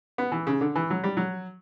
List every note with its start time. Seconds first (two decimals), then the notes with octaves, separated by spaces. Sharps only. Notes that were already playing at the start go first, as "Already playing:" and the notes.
0.18 B3
0.32 E3
0.47 C#3
0.61 D3
0.76 E3
0.90 F#3
1.04 G3
1.17 F#3